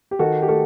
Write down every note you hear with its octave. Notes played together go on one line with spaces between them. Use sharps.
G4
D#3 F#4 A4
G4
A3 F#4 A4